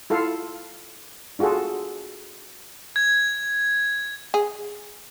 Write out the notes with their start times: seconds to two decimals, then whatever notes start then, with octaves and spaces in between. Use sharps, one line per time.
0.10 E4 F4 A4 F5
1.39 D4 F4 F#4 G#4 A4
2.96 G#6
4.34 G#4